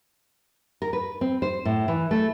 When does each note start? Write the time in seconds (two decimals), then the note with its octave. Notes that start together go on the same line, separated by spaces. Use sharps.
0.82 A#4
0.93 B4
1.21 C4
1.42 C5
1.65 A2
1.88 E3
2.11 A3